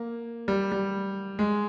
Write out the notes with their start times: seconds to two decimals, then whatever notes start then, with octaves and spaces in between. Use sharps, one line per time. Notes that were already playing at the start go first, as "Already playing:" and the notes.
Already playing: A#3
0.48 G3
0.72 G3
1.39 G#3